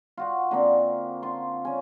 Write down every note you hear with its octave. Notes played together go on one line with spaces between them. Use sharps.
F4 F#4 F#5
D3 A#3 C4
F4 C6
C#4 G#5